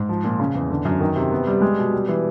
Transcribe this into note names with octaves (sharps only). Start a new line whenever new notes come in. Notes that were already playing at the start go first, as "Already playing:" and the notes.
Already playing: G#2
F3
A#2
C#3
E2
D3
F#2
D#3
C3
B3
G3
G#3
B2
G3
E3